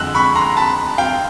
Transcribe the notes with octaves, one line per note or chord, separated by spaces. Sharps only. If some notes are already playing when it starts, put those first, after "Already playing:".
Already playing: F2 D3 G#3 E6 F#6
B5 C#6
A#5 C6
A5 B5
F5 G5